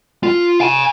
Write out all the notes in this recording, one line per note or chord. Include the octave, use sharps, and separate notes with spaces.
F4
F5 G#5